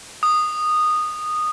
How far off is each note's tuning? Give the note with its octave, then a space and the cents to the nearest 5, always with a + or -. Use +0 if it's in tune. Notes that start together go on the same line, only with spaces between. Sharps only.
D#6 -15